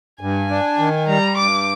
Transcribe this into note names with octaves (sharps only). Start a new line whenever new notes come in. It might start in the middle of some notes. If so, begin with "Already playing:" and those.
G2 G#5
D4
D#3
G3 A#5
G2 D6